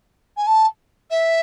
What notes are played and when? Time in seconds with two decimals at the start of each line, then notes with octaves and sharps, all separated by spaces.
0.37 G#5
0.47 A5
1.10 E5